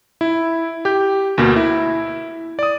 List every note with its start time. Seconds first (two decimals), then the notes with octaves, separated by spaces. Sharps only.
0.21 E4
0.85 G4 G6
1.38 D2 B2 A#3
1.56 E4
2.59 D5 D#6